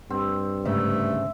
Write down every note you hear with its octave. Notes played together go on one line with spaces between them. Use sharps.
G2 C4
D2 G#2 C#3 A3 E5